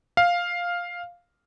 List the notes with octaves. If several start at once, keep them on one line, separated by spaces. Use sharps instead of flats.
F5